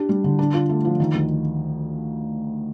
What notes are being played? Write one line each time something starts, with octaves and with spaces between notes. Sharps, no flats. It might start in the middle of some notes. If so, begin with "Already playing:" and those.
Already playing: D4 G4
G3
D3
D4
F4
A3
F3
D#3
D2